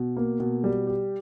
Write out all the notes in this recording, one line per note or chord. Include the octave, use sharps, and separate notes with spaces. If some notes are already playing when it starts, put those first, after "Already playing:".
Already playing: B2
A#3
B2
G3
G4